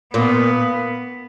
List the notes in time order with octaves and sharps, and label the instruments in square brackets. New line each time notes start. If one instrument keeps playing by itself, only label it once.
[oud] A#2 [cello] B3